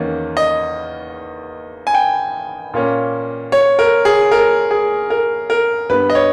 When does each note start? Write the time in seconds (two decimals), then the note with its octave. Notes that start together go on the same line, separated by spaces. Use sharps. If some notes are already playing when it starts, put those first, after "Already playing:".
Already playing: E2 D#3 A#3 C#4
0.37 D#5
1.87 G#5
1.95 G5
2.74 A#2 A#3 C#4
3.52 C#5
3.79 A#4
4.05 G#4
4.32 A#4
4.71 G#4
5.10 A#4
5.50 A#4
5.89 G2 G3 B3 B4
6.10 D#5
6.15 C#5